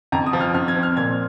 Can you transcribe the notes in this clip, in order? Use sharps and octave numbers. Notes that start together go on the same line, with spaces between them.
F2 A#5
D#6
F3
F6
F2 F6
G#6
C4
F6
A#2 G#6